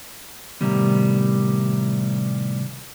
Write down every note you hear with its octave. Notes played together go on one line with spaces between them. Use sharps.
A2 C3 D#3 G3 B3